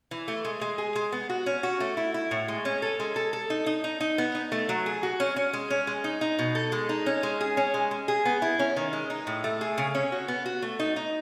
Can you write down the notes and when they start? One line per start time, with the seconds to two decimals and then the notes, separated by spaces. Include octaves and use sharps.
0.11 E3
0.28 A3
0.45 G#3
0.61 G#3
0.78 G#4
0.96 G#3
1.12 B3
1.29 F#4
1.46 C#4
1.63 F#4
1.80 A3
1.97 E4
2.14 E4
2.31 A2
2.48 G#3
2.65 C#4
2.82 A4
3.00 G#3
3.16 A4
3.33 A4
3.50 D#4
3.66 D#4
3.84 D#4
4.00 D#4
4.18 B3
4.35 D#4
4.52 A3
4.69 F#3
4.86 G#4
5.03 F#4
5.20 C#4
5.36 C#4
5.53 G#3
5.70 C#4
5.87 G#3
6.04 D#4
6.21 D#4
6.39 B2
6.55 A4
6.72 G#3
6.89 D#4
7.06 C#4
7.23 G#3
7.41 G#4
7.57 C#4
7.74 G#3
7.91 G#3
8.08 G#4
8.25 B3
8.42 E4
8.59 C#4
8.76 D#3
8.93 G#3
9.10 D#4
9.27 A2
9.44 A3
9.61 G#4
9.78 C#3
9.95 C#4
10.12 F#4
10.28 B3
10.46 F#4
10.62 A3
10.79 D#4
10.96 D#4